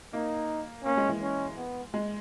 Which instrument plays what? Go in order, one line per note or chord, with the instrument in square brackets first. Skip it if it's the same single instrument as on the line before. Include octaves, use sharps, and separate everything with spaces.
[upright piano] A#3 [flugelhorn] D#4
[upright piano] A#3 [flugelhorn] C#4
[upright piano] G#3
E3
[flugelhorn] C#4
B3
[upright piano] G#3